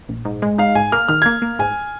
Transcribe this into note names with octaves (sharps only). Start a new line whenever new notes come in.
A#1
G#2
G#3
D#4 F5
G#2 G#5
A#3 F6
D#3 F6
A#3 G#6
A#3
G#2 G#5